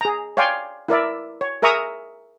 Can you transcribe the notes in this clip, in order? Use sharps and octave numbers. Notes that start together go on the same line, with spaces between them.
G#4 A#5
C#5 D5 F5 G5 G#5 C6
E4 A#4 D5 E5
C#5
G#4 A#4 E5 A#5 C#6 D#6